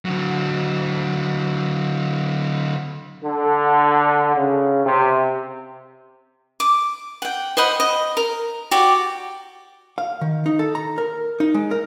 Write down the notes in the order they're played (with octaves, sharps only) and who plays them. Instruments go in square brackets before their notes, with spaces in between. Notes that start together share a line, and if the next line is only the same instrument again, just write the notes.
[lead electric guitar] D3 F#3
[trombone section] D3
C#3
C3
[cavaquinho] D6
F#5 G5
C5 D#5 F#5 B5
D#5
A#4
F#4 G4 D5
[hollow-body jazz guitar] F5
D#3
D#4
A4
A#5
A#4
D#4
G#3
A#4